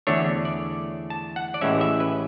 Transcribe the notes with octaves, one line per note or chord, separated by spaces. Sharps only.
E2 D3 A3 D4 C#5
D5
A5
F#5
D5
A1 A2 E3 G#3 C#4 E5
E5
B4